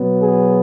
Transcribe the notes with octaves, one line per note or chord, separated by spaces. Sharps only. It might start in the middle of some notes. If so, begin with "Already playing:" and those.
Already playing: B2 F#3 B3
G#4